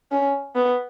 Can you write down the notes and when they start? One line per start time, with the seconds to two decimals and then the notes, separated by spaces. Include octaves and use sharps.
0.12 C#4
0.55 B3